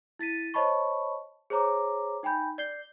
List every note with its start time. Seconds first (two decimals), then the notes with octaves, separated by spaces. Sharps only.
0.19 E4 A6 B6 D#7
0.54 C5 C#5 D#5 A5 B5 C#6
1.50 G#4 C5 C#5 A#5 D6
2.23 D#4 G5 G#5 B5 G6
2.58 D5 G6 C7 G7